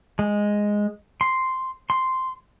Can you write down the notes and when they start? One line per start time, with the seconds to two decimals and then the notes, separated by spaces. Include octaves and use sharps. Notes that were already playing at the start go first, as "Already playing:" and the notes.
0.19 G#3
1.21 C6
1.90 C6